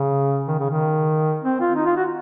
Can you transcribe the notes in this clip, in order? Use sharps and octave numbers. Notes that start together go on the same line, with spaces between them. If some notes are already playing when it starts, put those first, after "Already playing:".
Already playing: C#3
D#3
C#3
D#3
C4
F4
D#4
F4
F#4